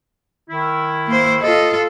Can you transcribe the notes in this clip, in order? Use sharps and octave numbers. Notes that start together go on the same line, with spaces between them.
D#3 E4
A#3 C5
F4 A4 D#5